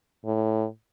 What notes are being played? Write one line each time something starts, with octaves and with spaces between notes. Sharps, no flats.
A2